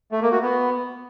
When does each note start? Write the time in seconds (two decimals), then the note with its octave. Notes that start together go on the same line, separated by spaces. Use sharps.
0.12 A3
0.22 A#3
0.32 F#4
0.42 B3